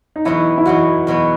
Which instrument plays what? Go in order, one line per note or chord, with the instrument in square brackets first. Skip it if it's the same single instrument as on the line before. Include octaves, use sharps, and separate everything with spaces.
[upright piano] D#4
[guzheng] E2 B2 F#3 B3 [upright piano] E4
[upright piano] E4
[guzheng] E2 B2 F#3 B3 [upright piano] F#4
[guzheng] E2 B2 F#3 B3